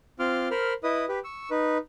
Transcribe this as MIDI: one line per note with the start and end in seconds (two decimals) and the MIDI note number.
0.19 0.48 60
0.19 0.48 65
0.19 0.48 84
0.19 0.48 86
0.19 0.48 89
0.51 0.73 70
0.51 0.73 72
0.51 0.73 83
0.51 0.73 89
0.84 1.05 64
0.84 1.05 71
0.84 1.05 75
0.84 1.05 87
1.09 1.19 67
1.09 1.19 71
1.24 1.50 85
1.24 1.50 88
1.51 1.78 63
1.51 1.78 71